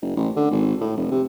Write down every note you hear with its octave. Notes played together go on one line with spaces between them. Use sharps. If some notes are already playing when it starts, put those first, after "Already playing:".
F#1
A1
D3
G#1
A2
F1
C3